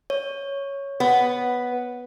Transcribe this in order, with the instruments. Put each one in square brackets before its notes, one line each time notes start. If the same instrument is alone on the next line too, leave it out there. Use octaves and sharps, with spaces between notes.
[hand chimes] C#5
[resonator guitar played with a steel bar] B3